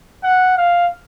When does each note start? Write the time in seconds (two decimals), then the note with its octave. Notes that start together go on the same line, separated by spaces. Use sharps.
0.24 F#5
0.58 F5